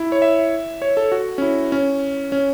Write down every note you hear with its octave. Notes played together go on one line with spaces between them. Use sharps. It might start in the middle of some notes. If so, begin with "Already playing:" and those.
Already playing: E4
C#5
E5
C#5
A4
F#4
C#4
E4
C#4
C#4